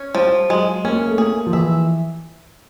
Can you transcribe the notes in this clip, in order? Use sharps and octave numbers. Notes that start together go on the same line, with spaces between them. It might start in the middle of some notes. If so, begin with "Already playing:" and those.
Already playing: C#4
F3 G3
F#3 G#3
A#3 C#4
A3
A#3 G#4
F3
E3 E5